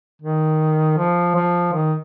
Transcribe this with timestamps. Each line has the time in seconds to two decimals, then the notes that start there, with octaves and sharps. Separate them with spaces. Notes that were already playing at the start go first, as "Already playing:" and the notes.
0.22 D#3
0.98 F3
1.35 F3
1.73 D#3